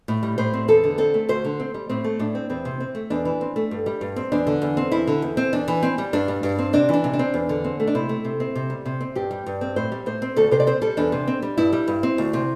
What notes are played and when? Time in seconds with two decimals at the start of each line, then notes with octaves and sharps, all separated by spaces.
0.08 A2
0.23 G3
0.38 A2 C5
0.53 C4
0.68 E2 A4
0.84 D3
0.98 C4 A4
1.14 A3
1.29 D2 C5
1.45 D3
1.60 C4
1.74 G3
1.89 A2 C4
2.04 A3
2.19 A2 D4
2.35 C4
2.50 E2 C4
2.65 C3
2.80 C4
2.95 A3
3.10 E2 D4
3.25 E3
3.41 C4
3.56 A3
3.71 G2
3.86 G3
4.01 G2
4.16 C4
4.32 E2 D4
4.47 D3
4.62 E2
4.77 C4
4.92 E2 E4
5.07 D3
5.22 E2
5.37 C4
5.53 E2 D4
5.68 E3
5.83 C4
5.98 G3
6.13 G2 D4
6.28 G3
6.43 G2
6.59 C4
6.73 C3 D4
6.89 E3 D4
7.04 C3
7.13 D4
7.19 C4
7.34 E2
7.49 D3
7.64 C4
7.80 A3
7.87 D4
7.95 C3 E4
8.09 A3
8.25 C3
8.40 C4
8.55 C3
8.70 G3
8.86 C3
9.01 C4
9.15 G2 G4
9.31 G3
9.46 G2
9.61 C4
9.76 A2 C5
9.92 G3
10.06 A2 C5
10.22 C4
10.36 D2 A4
10.51 C3 C5
10.60 D5
10.67 C4 C5
10.82 G3 A4
10.97 E2 D4
11.12 C3
11.27 C4
11.42 G3
11.57 G2 E4
11.73 G3
11.88 G2
12.03 C4
12.18 D2
12.33 C3